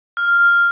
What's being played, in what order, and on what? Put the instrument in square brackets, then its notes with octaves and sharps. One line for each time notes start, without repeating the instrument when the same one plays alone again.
[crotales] F6